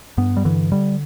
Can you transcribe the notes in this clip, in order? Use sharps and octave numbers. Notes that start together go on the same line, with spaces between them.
G2 B3
G3
D3 E3
D3 G3